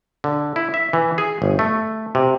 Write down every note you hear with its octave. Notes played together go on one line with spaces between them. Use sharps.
D3
E4
E5
E3
G#4
G1
A3
C3